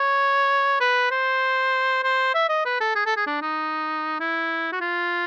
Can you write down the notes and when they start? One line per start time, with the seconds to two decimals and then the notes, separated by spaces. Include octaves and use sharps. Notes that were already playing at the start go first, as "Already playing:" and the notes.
Already playing: C#5
0.81 B4
1.11 C5
2.04 C5
2.34 E5
2.49 D#5
2.65 B4
2.80 A4
2.96 G#4
3.06 A4
3.17 G#4
3.27 D4
3.42 D#4
4.20 E4
4.73 F#4
4.81 F4